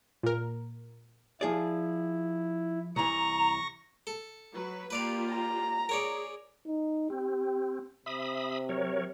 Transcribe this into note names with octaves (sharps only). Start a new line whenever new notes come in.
A#2 A#4
F3 E4 G#4 D5
C2 E3 A#5 C#6 A#6
A4
F#3 B4
A#3 F4 G4 B4 D5 F5
A#5
G#4 A#4 C#5 D5
D#4
C4 G4
C3 E5 B5 D#6
F#3 A#4 C#5